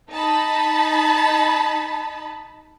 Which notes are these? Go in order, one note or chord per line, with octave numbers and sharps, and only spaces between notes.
D#4 A5 B5